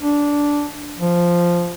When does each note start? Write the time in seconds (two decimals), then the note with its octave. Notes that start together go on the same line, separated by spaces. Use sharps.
0.01 D4
1.00 F3